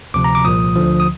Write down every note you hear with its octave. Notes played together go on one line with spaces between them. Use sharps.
D2 C3 F3 D6
A#5
D6
C2 A#2 F3 D#6
D2 D3 F3
D#6